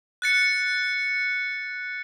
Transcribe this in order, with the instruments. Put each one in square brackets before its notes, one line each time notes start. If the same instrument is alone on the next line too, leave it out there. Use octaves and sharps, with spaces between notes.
[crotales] F#6 A6 C#7